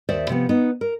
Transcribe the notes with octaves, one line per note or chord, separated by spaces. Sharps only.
D#2 C5 D5 E5
C3 F3 B3
B3 D#4
A#4